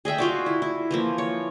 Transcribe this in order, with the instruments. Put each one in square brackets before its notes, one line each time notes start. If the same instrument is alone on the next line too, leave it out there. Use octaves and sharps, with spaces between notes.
[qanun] G#4 D#5 E5 G5
F4 F#4 D5
E4
E4
E3 F3 A#3
C#5